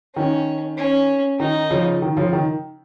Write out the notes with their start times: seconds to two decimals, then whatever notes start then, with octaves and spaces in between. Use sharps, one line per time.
0.16 D#3 C#4
0.78 C#4
1.40 D#3 D#4
1.70 C#3 F3
2.02 D#3
2.17 C#3 F3
2.33 D#3